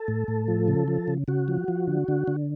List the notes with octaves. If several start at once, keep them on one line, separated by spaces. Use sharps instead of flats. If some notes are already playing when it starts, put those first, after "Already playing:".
Already playing: A4
A2
A2
F3
C#3
F3
C#3
C#3 F#4
F3
F3
D3
D3
D3